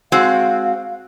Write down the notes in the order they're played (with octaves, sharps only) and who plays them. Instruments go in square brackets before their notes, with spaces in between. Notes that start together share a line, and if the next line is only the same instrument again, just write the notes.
[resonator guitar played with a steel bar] G#3 C4 F#4 [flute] F5